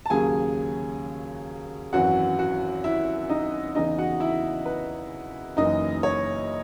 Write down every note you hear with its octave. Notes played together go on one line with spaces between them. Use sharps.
A5
D#2 C#3 F#3 G#4 G#5
G#1 F#2 E3 F#4 F#5
F#4 F#5
E4 E5
D#4 D#5
E2 C#3 E3 D#4 D#5
F#4 F#5
E4 E5
B4
F#1 F#2 E3 D#4 D#5
C#5